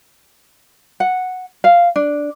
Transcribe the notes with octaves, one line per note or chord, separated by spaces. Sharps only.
F#5
F5
D4